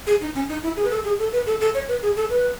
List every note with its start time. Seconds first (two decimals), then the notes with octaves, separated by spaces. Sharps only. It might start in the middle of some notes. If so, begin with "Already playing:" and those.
0.07 G#4
0.21 D#4
0.35 C#4
0.49 D#4
0.63 E4
0.76 G#4
0.84 B4
0.91 A4
1.05 G#4
1.19 A4
1.33 B4
1.46 A4
1.61 A4
1.74 C#5
1.89 B4
2.02 G#4
2.16 A4
2.30 B4